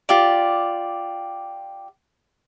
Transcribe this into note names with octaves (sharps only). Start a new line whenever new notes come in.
F4 G4 D5